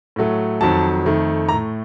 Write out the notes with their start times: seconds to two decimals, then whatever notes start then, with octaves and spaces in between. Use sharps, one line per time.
0.16 A2 F#3 A3
0.61 F2 D#3 F#3 A5
1.05 F2 D#3 A3
1.49 A2 A3 A#5